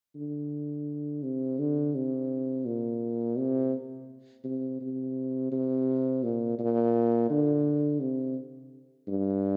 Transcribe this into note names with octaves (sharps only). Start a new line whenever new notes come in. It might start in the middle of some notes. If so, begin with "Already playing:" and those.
D3
C3
D3
C3
A#2
C3
C3
C3
C3
A#2
A#2
D3
C3
G2